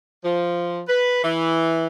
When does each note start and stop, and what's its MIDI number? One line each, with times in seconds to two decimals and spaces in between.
0.23 0.79 53
0.87 1.22 71
1.22 1.87 52